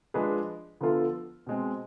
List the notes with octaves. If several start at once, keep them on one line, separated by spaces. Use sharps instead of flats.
F3 G#3 D4 G#4 B4
D3 F3 B3 F4 A4
B2 G#3 C4